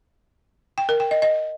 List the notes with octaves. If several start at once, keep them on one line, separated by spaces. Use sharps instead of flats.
G5
A#4
G5
D#5
D#5